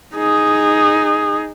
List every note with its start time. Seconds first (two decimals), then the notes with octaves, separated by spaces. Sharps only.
0.15 D#4 G#4